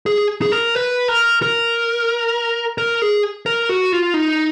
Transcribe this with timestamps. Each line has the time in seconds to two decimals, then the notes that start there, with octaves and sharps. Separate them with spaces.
0.06 G#4
0.42 G#4
0.52 A#4
0.75 B4
1.08 A#4
1.42 A#4
2.78 A#4
3.02 G#4
3.46 A#4
3.69 F#4
3.92 F4
4.14 D#4